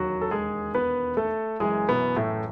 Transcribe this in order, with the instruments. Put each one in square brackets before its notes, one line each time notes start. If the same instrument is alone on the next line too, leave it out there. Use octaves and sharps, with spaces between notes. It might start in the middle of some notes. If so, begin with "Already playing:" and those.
Already playing: [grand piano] E1 D#2 D#3 F#3 F#4
A4
G#3 G#4
B3 B4
A3 A4
F#1 F#2 E3 G#3 G#4
B2 B3
A2 A3